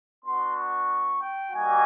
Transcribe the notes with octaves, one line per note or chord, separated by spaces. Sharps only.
B3 D4 F#4 C6
C#6
G5
G3 A#3 D#4 F#4 G#5